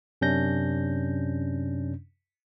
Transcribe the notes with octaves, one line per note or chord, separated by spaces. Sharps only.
F#2 C3 C#4 D4 G6 A#6